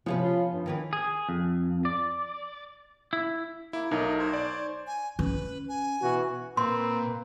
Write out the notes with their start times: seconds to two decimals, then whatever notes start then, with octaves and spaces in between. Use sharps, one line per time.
0.06 C3 F3 B3 C#4 B4
0.23 F4
0.53 G2
0.66 D#2 D#3 E3 B4
0.93 G#4
1.29 F2
1.85 D5
3.13 E4
3.73 A#3 E4
3.91 B1 A3 A#3 D#4 A#4 D#5
4.19 C5 C#5
4.33 D5
4.87 G#5
5.19 C#4 B4
5.69 G#5
6.01 B2 E3 F#4
6.57 A#2 A#3 C4 B4 C6